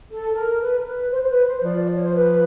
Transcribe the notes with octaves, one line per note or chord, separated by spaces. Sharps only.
A4
A#4
B4
A#4
B4
C5
C5
B4
C5
F3 D5
D5
C#5
C5
B4